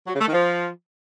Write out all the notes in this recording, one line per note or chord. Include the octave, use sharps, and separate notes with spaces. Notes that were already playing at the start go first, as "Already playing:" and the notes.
F#3
C#3
A3
D#3
F3